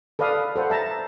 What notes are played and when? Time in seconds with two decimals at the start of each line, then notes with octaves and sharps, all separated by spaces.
0.19 A4 B4 D5 F5 D#6
0.56 A4 C5 F#5
0.70 E5 A5 A#5